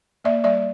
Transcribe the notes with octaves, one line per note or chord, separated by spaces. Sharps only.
A#3 D5 E5
G3 D5 E5